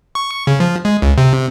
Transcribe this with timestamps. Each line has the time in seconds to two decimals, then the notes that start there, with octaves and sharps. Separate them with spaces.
0.15 C#6
0.47 C#3
0.60 F3
0.85 G#3
1.02 C#2
1.18 C3